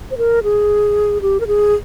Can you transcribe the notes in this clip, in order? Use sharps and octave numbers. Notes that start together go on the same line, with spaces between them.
C5
A#4
G#4
G4
A#4
G#4